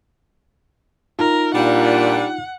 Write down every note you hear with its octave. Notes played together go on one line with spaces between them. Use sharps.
D#4 F4 A#4
A#2 G3 D4 F#5